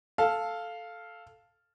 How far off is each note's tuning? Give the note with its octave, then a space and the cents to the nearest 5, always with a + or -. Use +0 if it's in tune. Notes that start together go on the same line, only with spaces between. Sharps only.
A4 +0 F5 +0